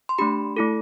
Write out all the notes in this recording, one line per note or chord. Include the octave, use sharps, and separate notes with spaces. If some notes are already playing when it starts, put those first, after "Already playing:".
C6
A3 D4 G4 B5
A3 E4 A4